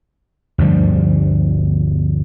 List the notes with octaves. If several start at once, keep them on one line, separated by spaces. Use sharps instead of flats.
D2 G2 F3 G3